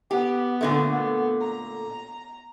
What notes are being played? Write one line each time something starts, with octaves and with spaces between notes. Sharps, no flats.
B3 G4
A#2 D3 A3
B3
A#5